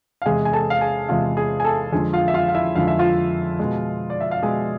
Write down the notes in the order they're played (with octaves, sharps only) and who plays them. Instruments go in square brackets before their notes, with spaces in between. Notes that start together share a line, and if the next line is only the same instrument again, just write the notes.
[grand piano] F5
E2 C3 G#3 G#4 G#5
G#5
A4 A5
F5
G#4 G#5
E2 C3 G#3 F4 F5
G#4 G#5
G#5
A4 A5
F2 D3 G#3 G#4 G#5
F4 F5
E5
F4 F5
F5
E4 E5
F2 D3 G#3 F5
E5
F4 F5
B2 G#3
D5
E5
F5
B2 G#3 G#4 G#5